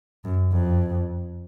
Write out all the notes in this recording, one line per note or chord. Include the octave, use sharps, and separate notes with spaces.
F#2
F2